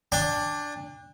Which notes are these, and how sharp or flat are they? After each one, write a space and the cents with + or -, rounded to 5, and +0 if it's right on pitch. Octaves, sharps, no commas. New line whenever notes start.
D4 +0 G5 +45